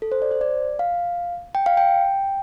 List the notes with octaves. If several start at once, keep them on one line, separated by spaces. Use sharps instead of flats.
A4
C5
D5
C5
D5
F5
G5
F5
G5